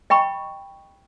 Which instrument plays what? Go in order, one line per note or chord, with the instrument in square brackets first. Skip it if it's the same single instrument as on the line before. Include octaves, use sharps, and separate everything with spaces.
[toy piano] D#5 G5 B5 C#6